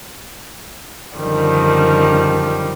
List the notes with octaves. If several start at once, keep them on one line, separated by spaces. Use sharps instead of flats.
F#2 D3 D#3 F3 G3